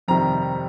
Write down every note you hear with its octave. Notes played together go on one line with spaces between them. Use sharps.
F2 C3 D#3 G3 A#5